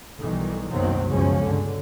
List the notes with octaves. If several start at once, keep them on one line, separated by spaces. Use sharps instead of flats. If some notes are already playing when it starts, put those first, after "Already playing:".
B1 D#3 E3 G3 A3
F#1 C2 B2 D#3 F#3 C4
C#2 F#2 B2 F3 C#4
G2 B2 D3